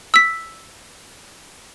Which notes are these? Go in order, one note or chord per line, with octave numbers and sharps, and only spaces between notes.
E6 B6